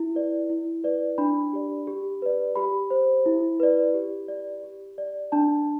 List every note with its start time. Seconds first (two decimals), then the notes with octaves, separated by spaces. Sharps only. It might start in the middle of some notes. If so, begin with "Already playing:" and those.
Already playing: E4
0.15 B4 D5
0.50 E4
0.84 B4 D5
1.18 D4 B5
1.53 G4 D5
1.87 G4
2.22 B4 D5
2.56 G4 B5
2.91 C5
3.26 E4
3.60 B4 D5
3.94 G4
4.28 D5
4.64 G4
4.98 D5
5.32 D4 A5